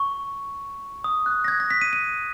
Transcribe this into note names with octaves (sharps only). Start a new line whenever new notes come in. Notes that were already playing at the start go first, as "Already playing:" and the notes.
Already playing: C#6
D#6
F#6
A#6
G#6
A#6
B6
D#7
D#7